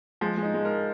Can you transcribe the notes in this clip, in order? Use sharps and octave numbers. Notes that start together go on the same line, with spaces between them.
F3 G#3
G#3
D#4
G#3
A#4